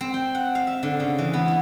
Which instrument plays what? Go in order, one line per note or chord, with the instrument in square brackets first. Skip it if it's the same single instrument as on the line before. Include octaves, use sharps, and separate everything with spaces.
[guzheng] C4
G5
F#5
F5
E5
D3
C#3
E3
B3
E4